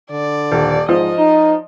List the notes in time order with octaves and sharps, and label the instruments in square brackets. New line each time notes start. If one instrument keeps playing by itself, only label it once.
[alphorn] D3 [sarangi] D5
[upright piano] D#1
[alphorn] G#2 [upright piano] F3 [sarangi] D#5
[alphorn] D#4